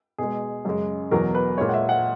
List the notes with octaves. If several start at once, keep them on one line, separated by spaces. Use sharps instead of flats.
B2 G#3 G#4
F#2 C#3 G#3
E2 B2 F#3 A#4
B4
A#2 G#3 C#5
F#5
E5
F#5